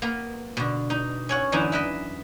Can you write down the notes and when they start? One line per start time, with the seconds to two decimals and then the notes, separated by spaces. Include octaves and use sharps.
0.02 A#3 B3 A#4
0.57 B2 D3
0.90 D#4
1.29 C#4 C#5 F#5
1.52 F#2 D3 E3 B3 D#4 E4
1.72 E4 B4 D#5